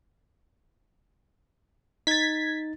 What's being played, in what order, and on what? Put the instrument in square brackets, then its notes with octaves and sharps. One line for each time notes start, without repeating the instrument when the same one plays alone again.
[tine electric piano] D#4 A6 [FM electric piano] G#6 B6